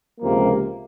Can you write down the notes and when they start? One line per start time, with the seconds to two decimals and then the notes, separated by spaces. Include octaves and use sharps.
0.20 C#2 C3 F3 A#3